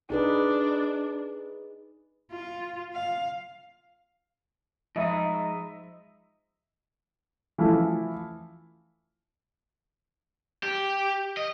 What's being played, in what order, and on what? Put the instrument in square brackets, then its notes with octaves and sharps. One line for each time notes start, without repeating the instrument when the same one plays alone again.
[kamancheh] D4 [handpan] D#4 G#4 B4
[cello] F4
F5
[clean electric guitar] G#2 D#4 [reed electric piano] F3 B5 D#6 [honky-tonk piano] D#5 E5
[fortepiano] E3 F3 A3 E4
[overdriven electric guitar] G4
D#5